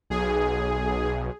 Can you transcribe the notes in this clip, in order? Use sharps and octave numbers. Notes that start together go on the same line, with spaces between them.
B1 G#4